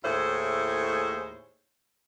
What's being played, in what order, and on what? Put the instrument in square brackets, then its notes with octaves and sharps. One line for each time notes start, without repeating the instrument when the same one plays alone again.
[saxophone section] D#2 A2 E4 G#4 C5 C#5